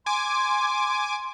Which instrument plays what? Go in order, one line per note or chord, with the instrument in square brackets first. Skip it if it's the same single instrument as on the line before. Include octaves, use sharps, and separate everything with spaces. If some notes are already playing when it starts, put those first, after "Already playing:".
[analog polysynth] G#5 D6 [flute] C6